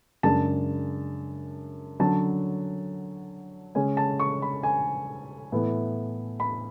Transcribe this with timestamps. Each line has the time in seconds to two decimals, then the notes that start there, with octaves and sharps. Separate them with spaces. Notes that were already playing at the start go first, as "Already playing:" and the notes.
0.23 F#2 C#3 G#3 D4 A5
2.00 D3 F#3 C#4 A5
3.75 C#3 G#3 C#4 G#5
3.97 A5
4.20 C#6
4.42 B5
4.63 G#5
5.52 A2 E3 B3 E4
6.40 B5